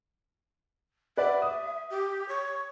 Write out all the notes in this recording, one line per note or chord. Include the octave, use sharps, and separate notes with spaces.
B4 D5 E5 F#5
D#6
G4
C#5